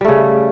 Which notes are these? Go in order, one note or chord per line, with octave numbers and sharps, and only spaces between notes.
C#3 G3 A3